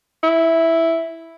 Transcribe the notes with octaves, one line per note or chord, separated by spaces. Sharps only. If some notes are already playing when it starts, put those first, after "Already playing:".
E4